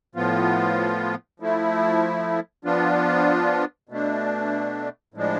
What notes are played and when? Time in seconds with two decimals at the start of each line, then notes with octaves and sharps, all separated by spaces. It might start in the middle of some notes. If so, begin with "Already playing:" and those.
0.15 A2 F3 B3 F4
1.40 F3 A3 E4
2.65 F3 B3 D4 F4
3.89 B2 A3 D4
5.14 A2 F3 G#3 D4